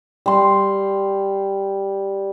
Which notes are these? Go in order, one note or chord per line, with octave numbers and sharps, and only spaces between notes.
G3 C6